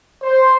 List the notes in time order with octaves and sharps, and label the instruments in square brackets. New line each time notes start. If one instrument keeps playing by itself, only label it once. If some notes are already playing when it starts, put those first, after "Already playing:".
[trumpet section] C5